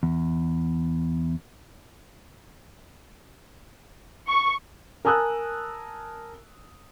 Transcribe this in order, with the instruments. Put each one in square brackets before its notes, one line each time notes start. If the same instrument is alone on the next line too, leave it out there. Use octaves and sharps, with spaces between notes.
[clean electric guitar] E2
[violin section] C#6
[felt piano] A#4 G#5 A5 D#6 E6 F#6